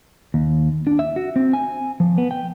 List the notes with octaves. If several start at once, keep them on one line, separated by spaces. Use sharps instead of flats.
D#2
D4
E5
F#4
C4
G#5
F3
B3
G5